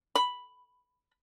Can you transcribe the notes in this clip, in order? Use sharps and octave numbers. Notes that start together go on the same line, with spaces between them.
B5